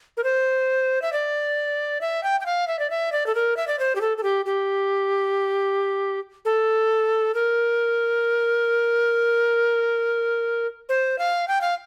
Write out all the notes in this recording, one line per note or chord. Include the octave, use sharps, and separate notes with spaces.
A#4
C5
E5
D5
E5
G5
G5
F5
E5
D5
E5
D5
A4
A#4
E5
D5
C5
G4
A4
A4
G4
G4
A4
A#4
C5
F5
G5
F5